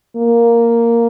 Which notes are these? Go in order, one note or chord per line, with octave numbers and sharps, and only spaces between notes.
A#3